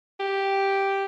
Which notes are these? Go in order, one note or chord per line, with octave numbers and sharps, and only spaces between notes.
G4